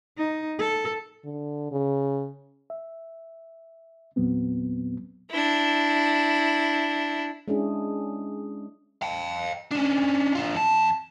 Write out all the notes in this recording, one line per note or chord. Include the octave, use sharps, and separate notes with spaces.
D#4
A4
D3
C#3
E5
E2 A#2 F#3 B3 C4
D4 E4
G#3 C#4 D4 E4 G#4
F5 G5
C#4 D4
D4 F4
F2 A5